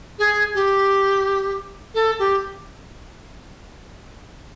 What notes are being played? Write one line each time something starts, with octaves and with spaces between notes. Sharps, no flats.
G#4
G4
A4
G4